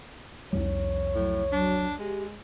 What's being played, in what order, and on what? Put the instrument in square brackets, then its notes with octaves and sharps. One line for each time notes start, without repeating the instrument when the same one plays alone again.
[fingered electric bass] C2 F2 G3 [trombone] C#5
[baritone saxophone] A2 [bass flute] F#3
[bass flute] F#3 [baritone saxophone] D4
[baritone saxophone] G#3 [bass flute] G4